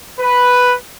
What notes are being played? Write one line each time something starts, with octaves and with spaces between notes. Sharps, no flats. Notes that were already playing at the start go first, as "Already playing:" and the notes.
B4